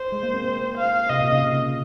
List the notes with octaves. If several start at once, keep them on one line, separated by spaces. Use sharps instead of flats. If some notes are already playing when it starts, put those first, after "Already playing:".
Already playing: C5
G#3
A#3
C4
A#3
F5
C3 D#5
A#2
C#3